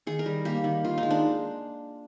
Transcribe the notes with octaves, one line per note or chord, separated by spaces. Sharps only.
D#3 G#4
A#4
G3
A#3 G4
D#3
D#3 F4
D#4
G#3
D4